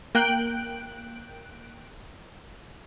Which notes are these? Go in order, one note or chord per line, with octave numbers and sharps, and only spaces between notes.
A#3 G5 F#6 D7